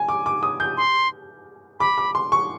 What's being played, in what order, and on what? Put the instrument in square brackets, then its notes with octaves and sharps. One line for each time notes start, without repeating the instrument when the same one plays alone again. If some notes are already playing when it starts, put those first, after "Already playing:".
Already playing: [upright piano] G#5
D6
D6
D#6
G6
[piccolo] C6
[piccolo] B5 [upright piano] D6
[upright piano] D6
C6
C#6